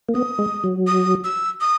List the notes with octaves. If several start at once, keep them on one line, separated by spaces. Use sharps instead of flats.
A#3
B3 D#6
G#3
F#3
D#6
E6
D#6